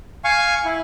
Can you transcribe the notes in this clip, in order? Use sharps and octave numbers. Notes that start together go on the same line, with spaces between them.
F5 G#5 C#6
E4